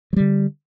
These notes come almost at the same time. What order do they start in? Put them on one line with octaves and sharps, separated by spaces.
F#3 G3 D3